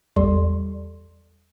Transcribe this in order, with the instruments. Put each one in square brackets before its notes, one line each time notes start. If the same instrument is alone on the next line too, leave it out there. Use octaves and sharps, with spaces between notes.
[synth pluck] A1 E2 G3 A4 D5 C6